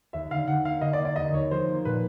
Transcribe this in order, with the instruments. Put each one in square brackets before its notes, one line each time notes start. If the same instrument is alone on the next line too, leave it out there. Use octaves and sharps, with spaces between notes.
[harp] D#2 [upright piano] E5
[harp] D3 [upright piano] F5
[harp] D3 [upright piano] F#5
[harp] A#3 [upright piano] F5
[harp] D3 [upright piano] D#5
[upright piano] D5
[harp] A#3
[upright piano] D5
[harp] D#2 [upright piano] D#5
[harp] D#2 [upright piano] C#5
[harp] F3 [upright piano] C5
[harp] A#3
[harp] A#2 [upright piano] B4